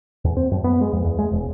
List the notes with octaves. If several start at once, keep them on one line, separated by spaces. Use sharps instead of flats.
E2
C4
F#2
B3
G#3
F2
E2
G#3
E1